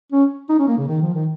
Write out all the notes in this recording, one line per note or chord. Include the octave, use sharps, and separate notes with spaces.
C#4
D#4
C#4
A#3
C#3
D#3
F3
D#3